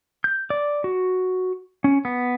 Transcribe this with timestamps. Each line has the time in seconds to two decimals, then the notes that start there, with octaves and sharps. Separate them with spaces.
0.24 G6
0.50 D5
0.84 F#4
1.84 C#4
2.05 B3